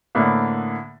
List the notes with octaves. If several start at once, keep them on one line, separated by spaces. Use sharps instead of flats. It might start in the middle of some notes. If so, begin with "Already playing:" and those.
A2 D3 A#3 B3